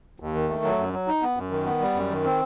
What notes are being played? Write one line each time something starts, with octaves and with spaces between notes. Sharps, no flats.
D#2
D#3
A3
F#3
F#2
F#3
D#4
B3
F#2
D#3
B3
G3
F#2
D#3
C4